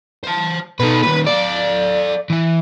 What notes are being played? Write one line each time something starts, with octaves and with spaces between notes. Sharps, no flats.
C5 A5
B2 D#4 A4 B4
A#2 D#3 B4
A4 D5 F5
E3 E4